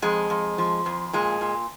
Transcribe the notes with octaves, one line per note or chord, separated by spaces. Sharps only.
F2 G#3
F2
F3
F2
A#2 G#3
A#2